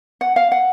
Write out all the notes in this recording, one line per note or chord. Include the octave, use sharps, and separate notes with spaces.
F#5
F5
F#5